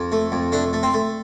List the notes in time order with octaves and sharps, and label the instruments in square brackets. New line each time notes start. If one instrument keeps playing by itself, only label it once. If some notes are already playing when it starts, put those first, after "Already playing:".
Already playing: [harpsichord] F2
A3
F2
A3 D4
A3
C4
A3